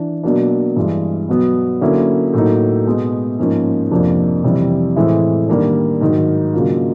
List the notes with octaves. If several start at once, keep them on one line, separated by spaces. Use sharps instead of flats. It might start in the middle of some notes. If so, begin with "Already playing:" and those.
Already playing: E3 D4
B2 F#3 A#3 D4
G2 E3 G#3
B2 F#3 B3
D3 F#3 A#3 C#4 E4
A2 F#3 A#3 D#4
B2 G#3 B3
G#2 F3 A#3 C#4
F2 C3 F3 A#3 D4
F2 C3 E3 G3
A2 E3 G#3 C4 E4
D#3 G3 A#3 D4
G#2 D#3 F#3
C#3 F#3 A#3 D4 F4